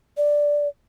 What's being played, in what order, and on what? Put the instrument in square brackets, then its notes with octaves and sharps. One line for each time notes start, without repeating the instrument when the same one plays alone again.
[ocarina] D5